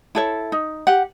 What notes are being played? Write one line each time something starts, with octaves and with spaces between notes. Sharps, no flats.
E4 A4 C#5
D#4
G4 F#5